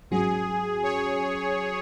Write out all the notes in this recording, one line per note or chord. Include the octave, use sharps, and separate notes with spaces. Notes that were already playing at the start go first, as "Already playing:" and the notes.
G#2 F#3 C#4 F#4 G#4
C#5